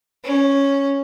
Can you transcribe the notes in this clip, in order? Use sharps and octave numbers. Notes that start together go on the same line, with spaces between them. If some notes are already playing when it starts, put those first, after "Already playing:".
C#4